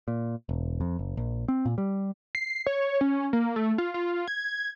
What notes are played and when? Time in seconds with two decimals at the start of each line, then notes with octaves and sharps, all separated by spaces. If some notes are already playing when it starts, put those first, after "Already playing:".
0.08 A#2
0.49 E1
0.81 F2
0.99 F#1
1.17 A#1
1.48 C4
1.65 A#2
1.78 G3
2.35 C7
2.67 C#5
3.01 C#4
3.33 A#3
3.56 A3
3.78 F4
3.94 F4
4.28 G#6